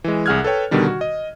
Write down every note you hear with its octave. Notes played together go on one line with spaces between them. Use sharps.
E3 G#3
C2 G#4 F#5 F6 F#6 G#6
A4 B4 C#5 G5
B2 D3 D#3 G3 D4
F#4
D#5